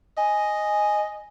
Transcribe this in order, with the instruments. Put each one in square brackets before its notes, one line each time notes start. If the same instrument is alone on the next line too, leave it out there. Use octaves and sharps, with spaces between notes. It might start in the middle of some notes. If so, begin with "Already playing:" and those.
[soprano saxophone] D#5 [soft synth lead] G#5